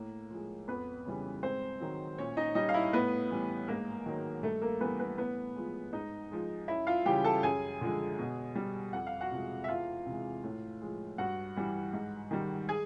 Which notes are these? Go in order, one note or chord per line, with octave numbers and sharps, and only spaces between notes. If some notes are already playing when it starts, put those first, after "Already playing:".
Already playing: A2 A#3
F3 G#3
F2 B3 B4
C#3 E3 G3
G#2 C4 C5
D#3 F#3
A#2 C#4 C#5
D#4 D#5
G3 D#4 D#5
F5
E4 E5
A2 B3 B4
E3 G3
G#2 A#3 A#4
D#3 F#3
G2 A3 A4
A#3 A#4
E3 G3 B3 B4
B3 B4
A2 B3 B4
F3 G#3
G#2 D#4 D#5
F3 G#3
F#2 E4 E5
F4 F5
C#3 E3 G3 G4 G5
A4 A5
F#2 G#4 G#5
D3 F3 G#3
B2
G3
F2 F#5
F5
F#4 F#5
C3 F3 G#3
E5
E2 F4 F5
C3 E3 G#3
A2
F3 G#3
G2 F#4 F#5
E3 G3
G#2
D#3 G3
G#4 G#5